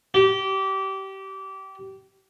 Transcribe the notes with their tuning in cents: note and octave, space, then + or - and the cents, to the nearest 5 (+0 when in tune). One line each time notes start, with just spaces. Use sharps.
G4 -25